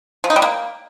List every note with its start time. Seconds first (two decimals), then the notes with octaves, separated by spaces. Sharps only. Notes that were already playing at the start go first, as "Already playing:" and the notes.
0.24 F3
0.30 D#4
0.36 G3
0.42 A#3